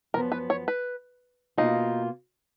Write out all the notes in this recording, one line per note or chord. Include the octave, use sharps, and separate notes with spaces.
F#2 F3 B3 A#4
B4
C#5
B4
B2 A#3 D#4 F4